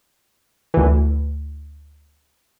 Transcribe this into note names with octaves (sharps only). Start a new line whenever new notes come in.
D2 E3